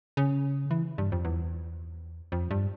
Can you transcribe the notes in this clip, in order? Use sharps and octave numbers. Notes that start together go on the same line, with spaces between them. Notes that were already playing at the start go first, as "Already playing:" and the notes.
C#3
E3
G2
F2
E2
F2
G2